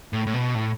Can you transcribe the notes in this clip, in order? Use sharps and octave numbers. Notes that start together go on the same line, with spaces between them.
A2
A2
B2
A2